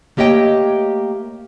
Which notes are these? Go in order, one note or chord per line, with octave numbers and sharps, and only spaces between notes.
A3 A#3 G4 C#5 D#5 G5